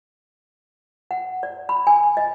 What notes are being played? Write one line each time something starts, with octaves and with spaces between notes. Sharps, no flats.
F#5
D5
B5
G#5
D#5